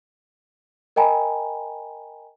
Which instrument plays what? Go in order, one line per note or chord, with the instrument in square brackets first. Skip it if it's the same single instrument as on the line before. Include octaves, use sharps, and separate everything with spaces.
[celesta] A#4 D#5 G5 G#5 A#5 B5